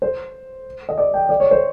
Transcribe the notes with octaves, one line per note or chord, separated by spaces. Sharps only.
C5
D#5
D5
G5
D5
C#5
C5